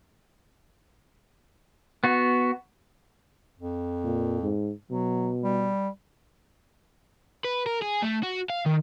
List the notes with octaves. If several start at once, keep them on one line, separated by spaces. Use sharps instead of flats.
B3 F#4
F2
A#2
G#2
B2 F#3
G3
B4
A#4
G#4
A3
F#4
F5
D#3